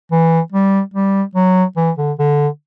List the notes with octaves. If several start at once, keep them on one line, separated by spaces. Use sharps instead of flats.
E3
G3
G3
F#3
E3
D3
D3